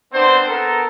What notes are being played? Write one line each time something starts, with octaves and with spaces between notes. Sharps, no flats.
B3 C4 D4 C5
B3 A4 A#4